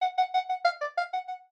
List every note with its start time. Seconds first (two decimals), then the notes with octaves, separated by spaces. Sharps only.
0.02 F#5
0.18 F#5
0.34 F#5
0.49 F#5
0.65 F5
0.81 D5
0.98 F5
1.13 F#5
1.28 F#5